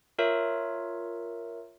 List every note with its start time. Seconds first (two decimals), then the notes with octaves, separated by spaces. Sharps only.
0.18 F4 A#4 C#5 E5